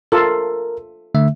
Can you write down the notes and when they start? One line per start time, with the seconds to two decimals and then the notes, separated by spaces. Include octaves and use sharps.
0.12 F4 A4 A#4
1.15 D3 A3 E5